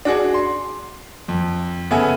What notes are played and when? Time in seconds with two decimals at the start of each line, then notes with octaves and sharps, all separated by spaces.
0.05 D4 F#4 G#4
0.34 C6
1.28 F2
1.91 C#3 B3 A4 E5 G#5